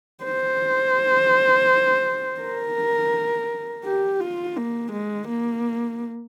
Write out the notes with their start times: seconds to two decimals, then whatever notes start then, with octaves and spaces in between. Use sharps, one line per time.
0.24 C5
2.41 A#4
3.85 G4
4.20 F4
4.57 A#3
4.92 G#3
5.28 A#3